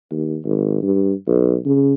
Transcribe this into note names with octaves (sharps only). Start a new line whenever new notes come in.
D#2
G#1
G2
B1
C#3